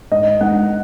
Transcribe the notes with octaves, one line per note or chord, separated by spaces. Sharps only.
G#2 D#5
G#3 D#4 F#5